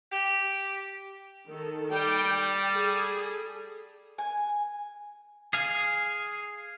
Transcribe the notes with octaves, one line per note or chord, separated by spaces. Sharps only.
G4
D#3 A4
G3 G5
G#4 A4
G#5
G#4 F5 G#5